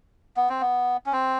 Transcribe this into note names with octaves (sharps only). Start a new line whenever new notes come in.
B3
C4
B3
C#4
C4